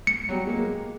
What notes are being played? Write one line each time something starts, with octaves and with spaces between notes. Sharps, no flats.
C#7
F#3 G3
G#3 A#3